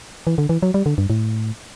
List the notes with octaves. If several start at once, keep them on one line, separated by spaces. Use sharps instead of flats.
E3
D3
E3
F#3
G3
D3
G2
A2